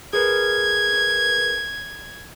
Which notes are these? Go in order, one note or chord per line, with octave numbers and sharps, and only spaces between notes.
G#4 A#4 B4 G#6